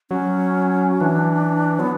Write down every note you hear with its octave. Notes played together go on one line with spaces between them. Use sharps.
F#3 C#4
E3 D4
F#3 B3